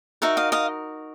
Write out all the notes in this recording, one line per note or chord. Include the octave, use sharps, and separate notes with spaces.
D#4 F#4 A#4 E5 F#5
D#5 F5
D#5 F5